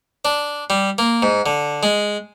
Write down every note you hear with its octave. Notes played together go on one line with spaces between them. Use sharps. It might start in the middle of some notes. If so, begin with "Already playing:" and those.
D4
G3
A#3
G#2
D3
G#3